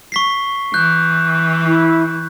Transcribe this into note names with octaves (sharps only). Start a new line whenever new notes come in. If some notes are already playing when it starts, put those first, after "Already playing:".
C#6 B6 C7
E3 F#6 G6
E4